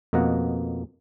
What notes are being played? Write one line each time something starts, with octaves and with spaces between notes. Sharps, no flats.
F2 B2 A#3 D#5 F#5